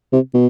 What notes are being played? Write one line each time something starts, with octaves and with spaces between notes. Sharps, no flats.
C3
B2